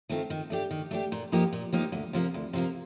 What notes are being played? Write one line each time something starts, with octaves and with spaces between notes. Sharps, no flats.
D#3 A3 C4 F4
D#3
A3 D4 G4
D#3
A3 D4 G4
A#2
F3 A#3 D#4 G4
A#2
F3 A#3 D#4 G4
D2
C3 F3 A#3
D2
C3 F3 A#3